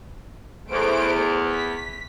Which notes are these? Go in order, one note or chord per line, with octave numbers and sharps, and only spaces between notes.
E2 A3 C5 D7
B6